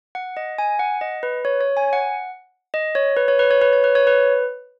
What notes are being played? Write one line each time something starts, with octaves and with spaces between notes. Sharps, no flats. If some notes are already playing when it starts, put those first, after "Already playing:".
F#5
D#5
G#5
F#5
D#5
B4
C#5
C#5
G#5
F#5
D#5
C#5
B4
C#5
B4
C#5
B4
C#5
B4
C#5
B4